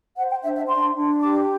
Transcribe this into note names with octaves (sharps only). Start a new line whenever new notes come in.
C5 F#5
G5
D4 E5
E5
D4 C6
D4
G4 D6